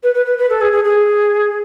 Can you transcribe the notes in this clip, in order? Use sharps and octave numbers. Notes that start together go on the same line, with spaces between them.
B4
B4
B4
B4
A4
G#4
G#4
G#4